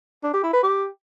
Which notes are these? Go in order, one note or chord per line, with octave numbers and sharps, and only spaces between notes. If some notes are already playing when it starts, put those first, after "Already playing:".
D4
G4
E4
B4
G4